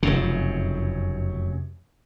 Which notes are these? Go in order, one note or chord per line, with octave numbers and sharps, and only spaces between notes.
F1 F#2 C#3